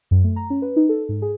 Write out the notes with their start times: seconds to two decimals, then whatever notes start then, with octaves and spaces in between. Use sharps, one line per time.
0.11 F#2
0.24 A3
0.36 A#5
0.50 C#4
0.62 B4
0.76 D#4
0.89 A4
1.09 G#2
1.22 G#4